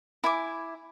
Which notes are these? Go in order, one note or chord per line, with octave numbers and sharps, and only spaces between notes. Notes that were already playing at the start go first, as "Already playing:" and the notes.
E4 G#5 D6